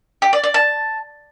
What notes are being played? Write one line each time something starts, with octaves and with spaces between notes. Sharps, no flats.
G4
D5
D5
A5